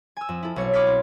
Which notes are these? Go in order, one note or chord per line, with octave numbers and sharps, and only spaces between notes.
G#5 E6
F2
E4 A4
B1 C#5 C#7
B5 C#6 D6 F6 G#6 B6
C4